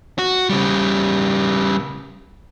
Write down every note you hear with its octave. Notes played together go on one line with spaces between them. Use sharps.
F#4
C#3 G3